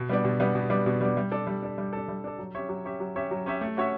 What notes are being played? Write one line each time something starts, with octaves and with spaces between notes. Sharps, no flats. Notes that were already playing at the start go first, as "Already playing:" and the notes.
Already playing: B2
G3 B3 D4
B2
G3 B3 D4
B2
G3 B3 D4
B2
G3 B3 D4
G3
D4 A4
G3
D4 A4
G3
D4 A4
G3
D4 A4
F#3
C#4 G4 C#5 E5
F#3
C#4 G4 C#5 E5
F#3
C#4 G4 C#5 E5
F#3
C#4 G4 C#5 E5
A3
C#4 F#4 C#5 E5